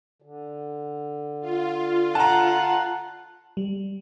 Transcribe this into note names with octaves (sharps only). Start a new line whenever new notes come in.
D3
F4
F#5 A5 A#5
G3